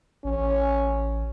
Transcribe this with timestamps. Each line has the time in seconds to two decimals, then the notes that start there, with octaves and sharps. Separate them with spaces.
0.24 A1 C#4